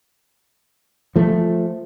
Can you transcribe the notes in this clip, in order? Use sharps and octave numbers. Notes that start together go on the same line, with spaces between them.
F3 A3